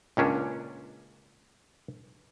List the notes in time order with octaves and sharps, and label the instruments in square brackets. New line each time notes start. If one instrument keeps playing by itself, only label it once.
[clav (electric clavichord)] C#2 A#2 C#4 D4